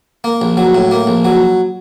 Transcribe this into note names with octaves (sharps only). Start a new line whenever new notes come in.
A#3
A#1
F#3
A2
A#3
A#1
F#3